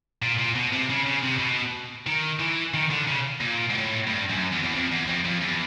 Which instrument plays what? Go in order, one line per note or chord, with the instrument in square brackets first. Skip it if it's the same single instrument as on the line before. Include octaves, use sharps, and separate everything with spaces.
[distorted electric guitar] A#2
A#2
B2
C3
C#3
C#3
C3
B2
D#3
E3
D#3
D3
C#3
A#2
G#2
A2
G2
F#2
E2
E2
F2
E2
F2
F2
E2